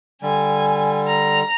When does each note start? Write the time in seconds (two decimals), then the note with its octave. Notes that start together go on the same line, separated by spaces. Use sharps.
0.22 D3 G3 G#5
1.07 A#5